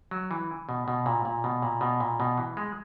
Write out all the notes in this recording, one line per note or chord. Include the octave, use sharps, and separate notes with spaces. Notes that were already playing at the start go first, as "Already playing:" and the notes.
F#3
E3
B2
B2
A#2
A#2
B2
A#2
B2
A#2
B2
E3
G#3